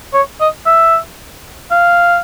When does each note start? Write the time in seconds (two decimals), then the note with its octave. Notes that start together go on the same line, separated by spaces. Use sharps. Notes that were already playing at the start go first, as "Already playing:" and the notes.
0.14 C#5
0.40 D#5
0.66 E5
1.71 F5